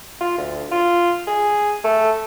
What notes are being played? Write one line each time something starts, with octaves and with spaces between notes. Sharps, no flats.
F4
D2
F4
G#4
A3